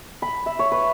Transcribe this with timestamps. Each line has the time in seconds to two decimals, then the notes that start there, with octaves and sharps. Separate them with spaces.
0.22 B5
0.46 E5
0.59 C#5
0.72 B4